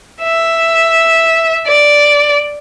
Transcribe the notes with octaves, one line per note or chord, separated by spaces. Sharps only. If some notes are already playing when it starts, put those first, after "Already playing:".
E5
D5